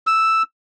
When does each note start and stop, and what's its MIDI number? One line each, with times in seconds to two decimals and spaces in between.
0.07 0.42 88